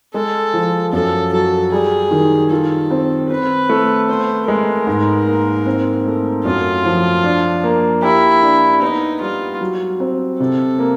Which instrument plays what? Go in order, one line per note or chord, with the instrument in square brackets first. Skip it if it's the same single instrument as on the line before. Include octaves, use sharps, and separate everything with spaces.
[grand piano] G#3 [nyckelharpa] A4
[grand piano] F3
[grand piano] F#2 [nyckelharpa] A4
[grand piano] F#3 [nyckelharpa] A4
[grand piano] G3 [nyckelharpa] G#4
[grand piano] D#3
[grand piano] F4 [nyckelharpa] A4
[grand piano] C4
[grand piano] C4 [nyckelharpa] B4
[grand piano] A3
[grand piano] B3 [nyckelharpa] C5
[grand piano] G#3 [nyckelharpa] A#4
[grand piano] G#2
A#3
C4
A3
[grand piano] F#2 [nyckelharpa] F4
[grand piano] F3
D4
A#3
[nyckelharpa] E4 [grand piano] G4
[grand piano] D4
[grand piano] B3 [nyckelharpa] D#4
[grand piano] G3 [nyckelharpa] F4
[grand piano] F#3
C4
[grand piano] C3 [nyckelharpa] A4
[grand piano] A#3